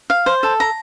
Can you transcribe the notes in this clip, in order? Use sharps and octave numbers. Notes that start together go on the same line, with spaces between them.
F5
C5
A4
A#5